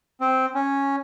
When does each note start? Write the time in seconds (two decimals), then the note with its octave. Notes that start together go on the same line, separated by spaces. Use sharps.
0.21 C4
0.55 C#4